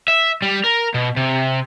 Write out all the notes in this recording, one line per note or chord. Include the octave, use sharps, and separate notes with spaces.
E5
G3
A#4
B2
C3